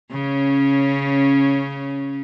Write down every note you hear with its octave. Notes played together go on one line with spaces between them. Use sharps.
C#3 C#4